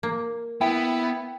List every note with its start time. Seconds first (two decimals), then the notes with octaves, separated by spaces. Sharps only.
0.03 A#3
0.61 B3 E4 G5